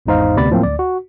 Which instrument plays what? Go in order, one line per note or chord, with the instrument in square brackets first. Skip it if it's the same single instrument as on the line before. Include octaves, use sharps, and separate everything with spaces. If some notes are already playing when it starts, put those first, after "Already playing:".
[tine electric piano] G#1 E2 G#2 D#4 C5 F5
D2 C3 B3 D5 B5 A6
A2 F3 F#3 A#3 C4
D2 D5
F#4